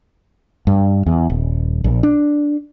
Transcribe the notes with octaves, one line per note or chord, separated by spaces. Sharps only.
G2
E2
D#1
A#1
D4